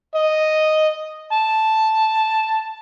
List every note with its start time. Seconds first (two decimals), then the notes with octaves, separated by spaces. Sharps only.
0.15 D#5
1.33 A5